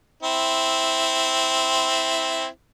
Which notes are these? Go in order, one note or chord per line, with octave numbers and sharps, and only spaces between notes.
C4 E4